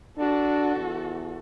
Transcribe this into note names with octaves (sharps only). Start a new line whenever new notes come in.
D4 F#4 A4
E2